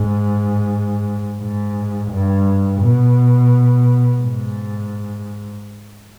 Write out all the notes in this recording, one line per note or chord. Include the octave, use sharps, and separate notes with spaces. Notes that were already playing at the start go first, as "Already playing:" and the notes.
Already playing: G#2
G#2
G2
B2
G#2